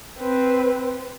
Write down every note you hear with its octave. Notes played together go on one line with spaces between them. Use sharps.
C4 B4